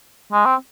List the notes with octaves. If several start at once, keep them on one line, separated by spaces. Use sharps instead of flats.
G#3
C4